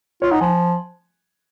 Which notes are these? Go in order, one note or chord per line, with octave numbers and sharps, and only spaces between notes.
F4 C#5
D#4 F#5
F3 G#5